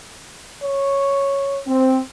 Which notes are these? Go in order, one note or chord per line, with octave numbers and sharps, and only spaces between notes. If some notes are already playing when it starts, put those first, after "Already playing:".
C#5
C4